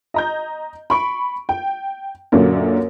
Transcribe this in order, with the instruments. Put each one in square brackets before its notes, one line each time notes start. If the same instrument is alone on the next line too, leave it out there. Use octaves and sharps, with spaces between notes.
[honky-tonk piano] D#5 A#5 G6
B5 C#6 D7
G5
F#2 A#2 D3 F#3 A#3